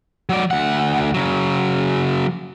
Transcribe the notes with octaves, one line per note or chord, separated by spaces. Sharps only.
F#3 D5
D2 F#5
C#3 F#3